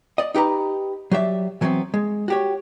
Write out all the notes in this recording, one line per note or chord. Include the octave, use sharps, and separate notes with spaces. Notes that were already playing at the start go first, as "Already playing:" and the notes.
D5 D#5
D#4 G4 B4 A#5
F#3 G4 D5 E5
E3 F#3 A3 B3 C4
G#3
F#4 G4 C#5